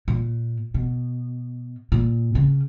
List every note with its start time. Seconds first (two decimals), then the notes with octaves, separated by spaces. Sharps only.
0.08 A#2
0.74 B2
1.92 A#2
2.35 C#3